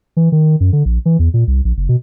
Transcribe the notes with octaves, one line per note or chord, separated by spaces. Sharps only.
E3
D#3
F#2
D3
A#1
E3
E2
A#2
C2
A#1
F#1
B2